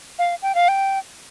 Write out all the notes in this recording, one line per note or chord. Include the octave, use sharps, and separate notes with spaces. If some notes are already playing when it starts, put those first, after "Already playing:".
F5
G5
F5
G5